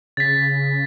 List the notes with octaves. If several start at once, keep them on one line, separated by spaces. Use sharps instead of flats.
C#3 A6 B6